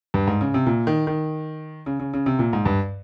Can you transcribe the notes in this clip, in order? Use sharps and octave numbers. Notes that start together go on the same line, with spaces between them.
G2
G#2
C#3
C3
A#2
D#3
D#3
C#3
C#3
C#3
C3
A#2
G#2
G2